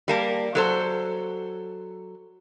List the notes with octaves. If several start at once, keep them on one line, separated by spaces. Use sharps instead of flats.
G3 A#3 A5
F#3 A4 C5